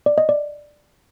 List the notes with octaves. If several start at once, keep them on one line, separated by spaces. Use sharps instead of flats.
D5
D#5
D5